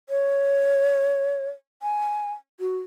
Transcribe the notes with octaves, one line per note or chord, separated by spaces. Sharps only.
C#5
G#5
F#4